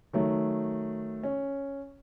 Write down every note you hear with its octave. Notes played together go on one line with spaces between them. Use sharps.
D#3 F#3 A3
C#4